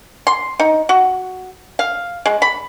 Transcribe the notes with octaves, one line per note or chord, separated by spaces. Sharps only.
C6
D#4
F#4
F5
G#3
B5